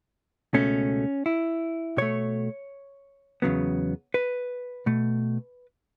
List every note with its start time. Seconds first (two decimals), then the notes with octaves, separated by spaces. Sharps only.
0.53 C#2 B2 A3 C#4
1.26 E4
1.97 B2 A3 C#5
3.42 E2 C#3 F#3 B3
4.14 B4
4.86 B2 A3